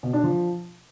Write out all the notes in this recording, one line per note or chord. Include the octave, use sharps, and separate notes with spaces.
B2
D4
F3